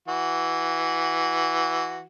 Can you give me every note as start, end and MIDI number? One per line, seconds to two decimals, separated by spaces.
0.08 2.05 52
0.08 2.05 66